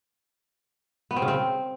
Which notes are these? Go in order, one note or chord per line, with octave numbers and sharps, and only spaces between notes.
B3
C4
C#3
C4